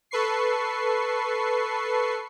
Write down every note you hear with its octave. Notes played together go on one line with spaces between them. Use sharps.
A4 B4 C#6 C7